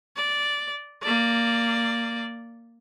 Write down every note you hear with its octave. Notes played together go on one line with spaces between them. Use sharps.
D5
A#3 D5